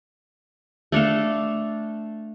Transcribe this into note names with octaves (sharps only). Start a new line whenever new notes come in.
A3 D4 A4 F5